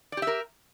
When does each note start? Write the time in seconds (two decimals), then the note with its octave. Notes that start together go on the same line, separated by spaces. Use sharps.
0.12 D5
0.17 G4
0.22 E5
0.27 A#4